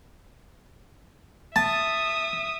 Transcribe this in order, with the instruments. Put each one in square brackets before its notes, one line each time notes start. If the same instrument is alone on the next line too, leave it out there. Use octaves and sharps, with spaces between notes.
[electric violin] E5 D#6 [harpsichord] A5